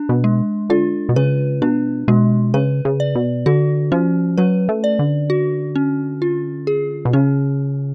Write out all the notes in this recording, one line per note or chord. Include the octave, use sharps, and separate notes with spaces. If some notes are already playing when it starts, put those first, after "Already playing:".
Already playing: D4
B2
G#3
D3 F4
B2
C#3 B4
B2 D4
B2 G#3
C#3 B4
C#3
D5
B2
D3 F#4
F3 C#4
F#3 B4
A3
D5
D3
F#4
C#4
F4
G#4
B2
C#3 C#4